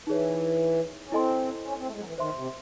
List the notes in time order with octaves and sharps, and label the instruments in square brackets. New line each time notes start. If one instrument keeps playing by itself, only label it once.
[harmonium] E3 [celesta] D#4 G#4 C#5
[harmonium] C#4
[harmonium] C4 [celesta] E4 A4 D#5 G#5 C6
[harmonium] C#4
C4
A3
G#3
F#3
E3
[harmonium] D#3 [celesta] C5 E5 C6
[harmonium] C3